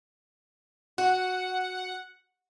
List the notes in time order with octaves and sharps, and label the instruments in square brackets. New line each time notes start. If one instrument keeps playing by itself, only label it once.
[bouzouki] F#4 [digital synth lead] F#5